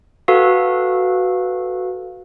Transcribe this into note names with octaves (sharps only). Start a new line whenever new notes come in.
F#4 A4 B4 F5